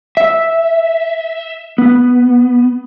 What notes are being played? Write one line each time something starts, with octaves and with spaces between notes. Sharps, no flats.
E5
B3